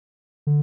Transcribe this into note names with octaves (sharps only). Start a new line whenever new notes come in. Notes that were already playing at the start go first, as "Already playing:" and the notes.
D3